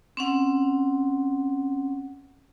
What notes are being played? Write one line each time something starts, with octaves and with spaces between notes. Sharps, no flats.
C4 C#4 F#5